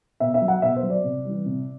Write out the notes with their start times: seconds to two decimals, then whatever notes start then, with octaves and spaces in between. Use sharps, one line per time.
0.20 B2 E5
0.34 E5
0.42 F#3
0.48 F#5
0.62 B2 E5
0.76 C5
0.83 F#3
0.90 D5
1.04 C3
1.25 E3 G3
1.46 C3